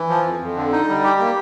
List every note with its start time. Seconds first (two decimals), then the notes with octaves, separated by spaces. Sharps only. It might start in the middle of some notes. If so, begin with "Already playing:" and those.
Already playing: E3
0.09 F3
0.25 F2
0.41 F2
0.56 D3
0.72 D#4
0.88 G3
1.04 G4
1.19 A#3